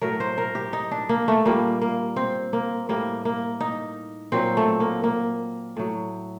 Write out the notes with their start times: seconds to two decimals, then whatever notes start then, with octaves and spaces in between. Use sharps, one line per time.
0.02 A2 F#3 A#4
0.20 C5
0.38 A#4
0.55 G4
0.73 D#4
0.91 D4
1.09 A#3
1.28 A3
1.45 A#2 G3 A#3
1.82 A#3
2.16 C4
2.53 A#3
2.89 A2 G3 A#3
3.25 A#3
3.61 D#4
4.32 A#2 F#3 C4
4.57 A3
4.80 A#3
5.04 A#3
5.77 A2 F#3